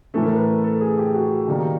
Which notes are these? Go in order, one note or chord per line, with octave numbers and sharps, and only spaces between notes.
A2 E3 A3 A4
A#4
B4
A4
G#4
G4
F#4
D#3 G3 A#3